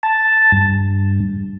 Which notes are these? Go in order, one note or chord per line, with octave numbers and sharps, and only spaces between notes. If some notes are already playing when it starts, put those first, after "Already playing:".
A5
G2